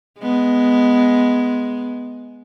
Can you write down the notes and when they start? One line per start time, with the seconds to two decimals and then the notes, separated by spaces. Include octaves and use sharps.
0.19 G#3 B3